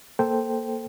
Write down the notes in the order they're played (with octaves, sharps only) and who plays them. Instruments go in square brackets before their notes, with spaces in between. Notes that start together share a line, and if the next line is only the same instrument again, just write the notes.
[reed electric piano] A#3 A4 C5 G5